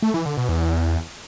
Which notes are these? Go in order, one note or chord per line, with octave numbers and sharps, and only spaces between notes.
A3
E3
D3
B2
E2